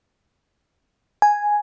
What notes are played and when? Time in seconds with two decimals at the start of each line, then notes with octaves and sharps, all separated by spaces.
1.22 G#5